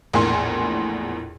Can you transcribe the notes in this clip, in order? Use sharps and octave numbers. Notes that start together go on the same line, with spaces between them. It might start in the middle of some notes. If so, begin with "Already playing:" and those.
A#1 E2 A2 A#4 G#5 C6